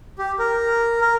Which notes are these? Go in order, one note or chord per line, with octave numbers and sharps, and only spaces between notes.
G4
A#4
A#4